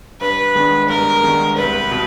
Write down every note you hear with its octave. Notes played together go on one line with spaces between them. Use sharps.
G2 B4
D#3 G#3 B3 D4
G2 A#4
D#3 G#3 B3 D4
C2 B4
B2